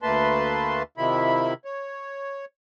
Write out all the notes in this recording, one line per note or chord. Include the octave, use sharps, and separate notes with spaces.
D2 A3 A#3 B4 A5 C6
C3 D#3 F3 E4 B5
C#5